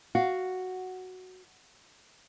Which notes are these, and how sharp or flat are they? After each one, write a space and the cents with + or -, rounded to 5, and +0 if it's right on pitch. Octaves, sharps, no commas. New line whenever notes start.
F#4 +0 F5 +0